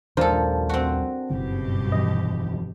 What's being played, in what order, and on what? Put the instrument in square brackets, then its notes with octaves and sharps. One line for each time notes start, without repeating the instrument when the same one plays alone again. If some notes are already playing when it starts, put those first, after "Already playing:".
[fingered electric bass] A#1 D#2 G3 [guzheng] F3 A4 [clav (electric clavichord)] D4 A#4 C5
[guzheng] C4 F#4
[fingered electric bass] F#1 [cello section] G2 B2 G4
[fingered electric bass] F1 E3 F3 [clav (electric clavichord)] D#5